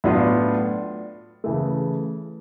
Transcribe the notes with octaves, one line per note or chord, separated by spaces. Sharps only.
A2 F#3 B3 D4 F4
C#3 E3 A3